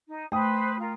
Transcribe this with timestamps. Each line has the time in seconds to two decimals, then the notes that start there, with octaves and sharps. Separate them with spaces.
0.07 D#4
0.32 A3 B4 C5 G5 D#6
0.78 F4 A#4